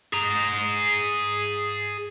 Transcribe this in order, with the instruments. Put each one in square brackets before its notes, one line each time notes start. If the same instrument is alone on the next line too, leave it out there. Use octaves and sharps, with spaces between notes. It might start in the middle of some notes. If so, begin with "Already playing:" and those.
[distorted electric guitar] G#4 A#5